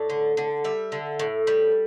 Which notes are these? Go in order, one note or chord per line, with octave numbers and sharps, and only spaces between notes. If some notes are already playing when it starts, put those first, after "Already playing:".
Already playing: A2 D5
D3
D3
G3 E5
D3
A2
G3